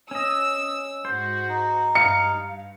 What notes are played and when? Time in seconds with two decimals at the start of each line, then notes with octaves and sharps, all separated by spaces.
0.11 C#4 D#5 E6
1.05 G#2 F#4 C5
1.49 D#4
1.95 G2 F5 C#7